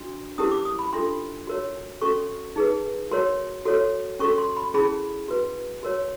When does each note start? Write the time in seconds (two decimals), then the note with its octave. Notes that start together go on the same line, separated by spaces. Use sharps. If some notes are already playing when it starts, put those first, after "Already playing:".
Already playing: D4 F#4
0.38 C#4 E4 G4 A#4 D#6
0.51 D6
0.65 D#6
0.79 B5
0.93 D4 F4 A4 C6
1.47 F#4 A#4 C#5
2.02 C#4 F#4 A4 C#6
2.56 D#4 G#4 B4
3.11 F#4 A#4 C#5 C6
3.65 F#4 A4 C#5
4.20 C#4 F#4 A4 C#6
4.38 C6
4.57 B5
4.74 C#4 E4 G#4 B5
5.28 F#4 B4
5.83 F#4 A#4 C#5